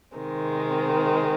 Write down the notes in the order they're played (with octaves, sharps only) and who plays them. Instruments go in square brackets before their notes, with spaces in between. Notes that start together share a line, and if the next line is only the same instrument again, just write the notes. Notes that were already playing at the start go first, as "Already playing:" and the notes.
[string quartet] C3 D#3 G#3 C4